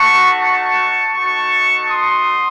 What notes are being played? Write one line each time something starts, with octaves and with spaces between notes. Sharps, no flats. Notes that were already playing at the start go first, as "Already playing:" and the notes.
Already playing: A3 D#4 F#4 A5 C#6
A5 C#6
A3 D#4 F#4 A5 C#6
C6 D#6